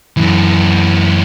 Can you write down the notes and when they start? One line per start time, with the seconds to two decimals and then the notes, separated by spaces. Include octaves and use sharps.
0.17 F#2 E3